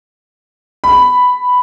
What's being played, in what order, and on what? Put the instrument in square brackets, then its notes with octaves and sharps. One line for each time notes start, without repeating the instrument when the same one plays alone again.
[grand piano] B5